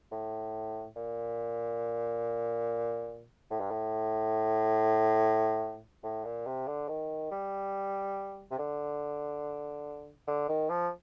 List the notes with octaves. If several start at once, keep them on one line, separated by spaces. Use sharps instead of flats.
A2
A#2
A2
G2
A2
A2
A#2
C3
D3
D#3
G3
C3
D3
D3
D#3
F3